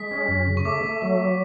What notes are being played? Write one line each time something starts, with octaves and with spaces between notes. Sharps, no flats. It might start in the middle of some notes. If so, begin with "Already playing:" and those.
Already playing: G#3 B6
C#4
F#2
C#3
C#6
A3 D6
A3
F#3